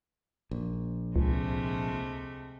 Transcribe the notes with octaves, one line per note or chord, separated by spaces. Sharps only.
A#1
C#2 C3 G#3 A3